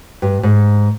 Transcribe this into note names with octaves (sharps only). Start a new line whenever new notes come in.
G2
G#2